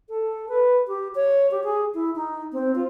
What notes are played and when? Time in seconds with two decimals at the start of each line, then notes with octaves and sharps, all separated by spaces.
0.09 A4
0.49 B4
0.88 G4
1.15 C#5
1.51 G4
1.63 G#4
1.94 E4
2.16 D#4
2.53 C4
2.75 F4